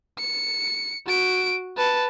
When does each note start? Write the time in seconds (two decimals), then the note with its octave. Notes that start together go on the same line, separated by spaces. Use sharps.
0.19 C#7
1.06 F#4 D7
1.77 B4 A5